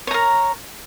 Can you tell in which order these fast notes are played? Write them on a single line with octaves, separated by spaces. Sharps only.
C#5 A#5 A#4